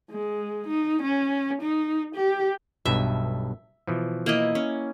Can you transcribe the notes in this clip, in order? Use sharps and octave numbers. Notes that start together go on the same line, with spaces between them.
G#3
D#4
C#4
D#4
G4
B1 G2 B2 E5
B2 E3 F3
A#3 E4 D#5
C#4